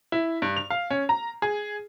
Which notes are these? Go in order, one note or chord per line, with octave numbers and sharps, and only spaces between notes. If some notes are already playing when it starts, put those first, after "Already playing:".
E4
G2
F7
F5
C#4
A#5
G#4